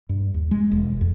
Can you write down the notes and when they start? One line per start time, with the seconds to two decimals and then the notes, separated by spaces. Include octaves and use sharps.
0.09 G2
0.34 D#2
0.51 G#3
0.71 E1
1.01 F2